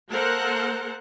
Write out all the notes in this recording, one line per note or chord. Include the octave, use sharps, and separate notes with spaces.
A#3 A4 A#4 C5 F#5